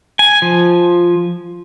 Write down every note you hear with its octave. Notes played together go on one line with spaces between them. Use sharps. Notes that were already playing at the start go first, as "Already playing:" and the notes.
G#5
F3